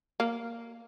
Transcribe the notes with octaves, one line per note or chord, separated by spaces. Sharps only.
A#3